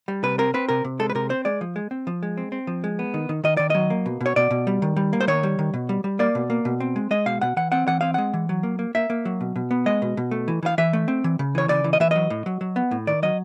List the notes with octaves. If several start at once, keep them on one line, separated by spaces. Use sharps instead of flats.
G3
C3 B4
C4 A#4
C4 B4
C3 A#4
C3
G#3 A4
B4
C3 A#4
C4 C5
G#3 D5
F3
G#3
C4
F3
G#3
C4
C4
F3
G#3
B3
D#3
D#3
D#3 D#5
D#3 D5
F#3 D#5
A#3
B2
B2
C#5
B2 D5
B2
G3
D#3
G3
A#3
C5
D#3 C#5
G3
D#3
B2
G3
G3
A#3 D5
B2
A#3
B2
C4
G#3
G#3 D#5
B2 F5
B2 F#5
E3 F#5
C4 F#5
E3 F#5
C4 F5
G#3 F#5
E3
F#3
A#3
A#3
A#3 E5
A#3
F#3
B2
B2
B3
G#3 D#5
B2
B2
A3
E3
E3 F5
E3 E5
A3
C4
E3
C#3
E3 C#5
C#3 D5
E3
D#5
E3 E5
F#3 D#5
A2
F#3
F#3
B3
A2
D#3 D5
F#3 D#5